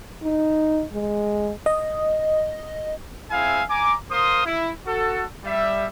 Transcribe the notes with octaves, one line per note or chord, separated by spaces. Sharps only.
D#4
G#3
D#5
C4 E4 G#4 E5 F5 G#5
G#5 A#5 D6
A#4 C5 F5 C6 D#6
E4
F#4 A4
G3 E5